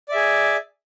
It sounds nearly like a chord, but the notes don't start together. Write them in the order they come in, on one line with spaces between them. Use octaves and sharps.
D5 E5 G#4